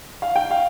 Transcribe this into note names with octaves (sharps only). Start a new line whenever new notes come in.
F5
G5
F5